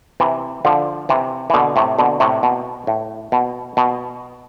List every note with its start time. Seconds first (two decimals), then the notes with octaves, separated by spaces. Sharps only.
0.20 C3 E3
0.65 D3 F3
1.09 C3 E3
1.50 E3
1.54 B2 D3
1.76 A2 C3
1.99 B2 D3
2.20 A2 C3
2.43 B2
2.87 A2
3.32 B2
3.77 B2